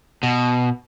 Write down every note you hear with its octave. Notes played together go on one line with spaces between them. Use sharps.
B2